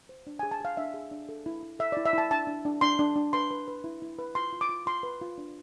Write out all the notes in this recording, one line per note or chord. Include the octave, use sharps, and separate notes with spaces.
C5
D4
G#4 G#5
A5
G#4 F5
D4 E5
G#4
D4
A4
E4
E4
A4 E5
D5
E4
E5
E4 A5
D4 A5
D4
D4
D4 C6
D4
D4
B4 C6
B4
B4
E4
E4
B4
F4 C6
F4
D6
F4
F4 C6
B4
F4
D4